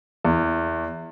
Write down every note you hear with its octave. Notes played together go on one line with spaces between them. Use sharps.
E2